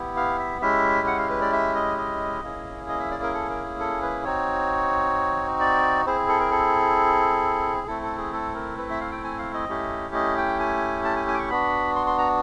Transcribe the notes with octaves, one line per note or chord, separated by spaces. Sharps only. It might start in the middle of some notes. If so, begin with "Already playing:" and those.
Already playing: B3 E4 G4
F5
E5
G#3 C#4 E4 G4 E5
F#5
F5
B4
D5
E5
D#5
D#5
A#3 C#4 E4 G#4
D#5
E5
D5
A#4
A4
A#4
A4
B4
C4 D#4 F#4 C#5
D5
C4 E4 G#4 C5
A4
A#4
A4
A3 C4 E4 A4
A4
G#4
A4
A#4
B4
E5
F5
G5
G#5
F5
D#5
A3 C#4 E4 G4
D#5
G5
G#5
A5
G#5
G#5
D6
C#6
B3 D4 F#4 B5
C6
C6
A#5